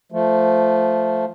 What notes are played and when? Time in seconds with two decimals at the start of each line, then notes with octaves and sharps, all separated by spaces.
0.12 F3 A3